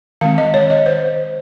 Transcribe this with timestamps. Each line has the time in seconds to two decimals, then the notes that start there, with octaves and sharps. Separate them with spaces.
0.21 D#3 G#3 C4 F5
0.38 D#5
0.54 C#5
0.70 D#5
0.86 C5